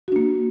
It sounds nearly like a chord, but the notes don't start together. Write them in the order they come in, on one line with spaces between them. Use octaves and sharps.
F#4 D4 A#3